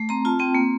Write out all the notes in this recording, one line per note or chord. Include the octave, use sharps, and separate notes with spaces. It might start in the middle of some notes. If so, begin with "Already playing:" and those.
Already playing: A3
C4 A#5
F4 A5
C4 G5
A#3